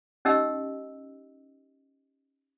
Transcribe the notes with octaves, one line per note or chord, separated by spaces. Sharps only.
C#4 D#4 G4 D#5 G5 E6